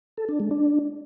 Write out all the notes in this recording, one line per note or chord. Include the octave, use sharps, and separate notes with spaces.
A4
D4
G#3
D4